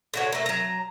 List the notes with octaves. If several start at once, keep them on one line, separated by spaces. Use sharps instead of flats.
D3 F#4 C#5
A3 A#3
F#3 A#5